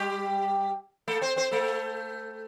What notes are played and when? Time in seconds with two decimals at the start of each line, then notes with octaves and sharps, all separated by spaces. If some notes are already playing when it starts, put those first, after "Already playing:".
Already playing: G3 G4
1.08 A3 A4
1.21 C4 C5
1.36 C4 C5
1.51 A3 A4